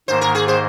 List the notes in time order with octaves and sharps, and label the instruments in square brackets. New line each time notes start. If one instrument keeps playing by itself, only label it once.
[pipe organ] G#2 D#3 A#3 [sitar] C5
[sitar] A#4
G#4
C5